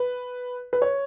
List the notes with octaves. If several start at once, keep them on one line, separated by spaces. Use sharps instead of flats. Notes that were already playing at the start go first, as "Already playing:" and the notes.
Already playing: B4
B4
C#5